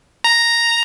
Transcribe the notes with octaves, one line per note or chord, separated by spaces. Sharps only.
A#5